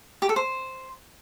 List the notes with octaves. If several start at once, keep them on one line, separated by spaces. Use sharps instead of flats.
G4
A4
C5